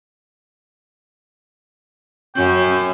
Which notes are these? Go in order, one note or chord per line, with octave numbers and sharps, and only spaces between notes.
F#2 C#4 G5